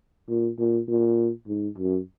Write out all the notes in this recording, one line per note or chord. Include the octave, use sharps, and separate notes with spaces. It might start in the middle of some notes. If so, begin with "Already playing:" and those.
A#2
A#2
A#2
G#2
F#2